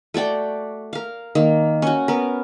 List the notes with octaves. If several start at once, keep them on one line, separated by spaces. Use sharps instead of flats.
A3 F#4 D5 G5
A#4 F5
D#3 A#3
C#4 F#4
B3 A#4